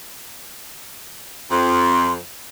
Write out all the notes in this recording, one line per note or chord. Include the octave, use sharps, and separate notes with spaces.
F2 C6